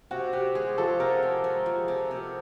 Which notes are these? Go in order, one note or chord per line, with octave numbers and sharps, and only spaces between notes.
C3 F#4
C3 G4
G#3 G#4
F3 A4
C3 A#4
C3
G#3
F3
C3
C3